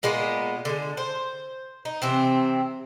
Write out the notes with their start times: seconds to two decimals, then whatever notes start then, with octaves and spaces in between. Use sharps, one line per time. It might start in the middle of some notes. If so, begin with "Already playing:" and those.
0.03 A#2 G#3 A#3 B3
0.65 D3 G#3
0.97 C5
1.85 D#4
2.02 C3 E3 C4